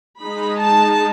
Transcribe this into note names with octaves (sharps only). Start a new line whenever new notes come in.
G#3 D#4 B5
A5